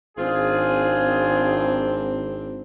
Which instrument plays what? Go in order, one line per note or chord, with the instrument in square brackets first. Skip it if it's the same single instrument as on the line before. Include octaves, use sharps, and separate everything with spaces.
[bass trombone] G#1 [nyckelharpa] C4 D4 [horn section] F4 G#4